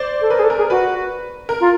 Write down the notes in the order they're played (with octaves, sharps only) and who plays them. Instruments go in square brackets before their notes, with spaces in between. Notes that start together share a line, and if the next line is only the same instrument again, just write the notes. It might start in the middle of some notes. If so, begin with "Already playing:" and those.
Already playing: [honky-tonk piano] C5 D5
[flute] A4
[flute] A#4 [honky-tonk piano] B4
[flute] G#4
A4
[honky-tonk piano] A#4
[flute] G#4
[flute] F#4 [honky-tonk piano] B4
[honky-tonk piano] A#4
[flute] F4